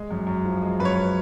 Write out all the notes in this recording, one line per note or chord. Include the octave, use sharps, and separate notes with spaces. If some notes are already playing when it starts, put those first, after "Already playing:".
Already playing: G#3
F#2
F#2
F3
G#3
F#2 B4
C#5